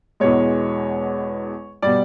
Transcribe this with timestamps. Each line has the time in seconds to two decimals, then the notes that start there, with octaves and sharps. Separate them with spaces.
0.20 E2 B2 G#3 C#5
1.82 B2 G3 D5